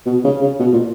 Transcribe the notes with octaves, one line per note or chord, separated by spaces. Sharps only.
B2
C#3
C#3
B2
A#2